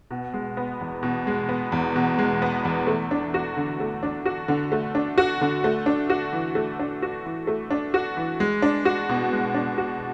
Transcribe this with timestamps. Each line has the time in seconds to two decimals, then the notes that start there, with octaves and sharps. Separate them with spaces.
0.11 B2
0.34 G#3
0.57 B3
0.81 E2
1.03 B2
1.27 G#3
1.49 B3
1.72 E2
1.96 B2
2.18 G#3
2.42 B3
2.65 E2
2.87 A3
3.11 D4
3.34 F#4
3.57 D3
3.80 A3
4.03 D4
4.26 F#4
4.48 D3
4.72 A3
4.95 D4
5.18 F#4
5.41 D3
5.64 A3
5.86 D4
6.10 F#4
6.33 E3
6.55 A3
6.79 D4
7.02 F#4
7.25 E3
7.47 A3
7.70 D4
7.94 F#4
8.17 E3
8.40 G#3
8.62 D4
8.85 F#4
9.09 B2
9.33 G#3
9.54 D4
9.78 F#4